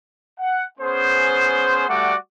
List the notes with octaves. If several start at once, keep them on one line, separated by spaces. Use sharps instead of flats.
F#5
B3 C#4 G#4 C5
G3 A3 F#4 D5 F#5 D6